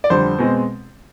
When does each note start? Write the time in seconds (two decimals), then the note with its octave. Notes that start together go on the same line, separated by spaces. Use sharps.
0.04 D5
0.10 F2 D3 G3 C5
0.38 B2 G#3 C4